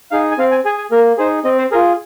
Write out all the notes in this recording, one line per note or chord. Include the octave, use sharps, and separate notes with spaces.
D#4 G#4 F5
G#5
C4 F5
G#5
G#4 G#5
G#5
A#3 A#4
D#4 G#4 C5
C4 D#5
C5
F4 G#4 A#4